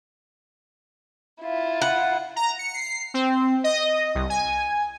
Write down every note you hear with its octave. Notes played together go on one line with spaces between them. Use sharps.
E4 F4
F#5
A#5
C#7
C7
C4
D#5
C2
G#5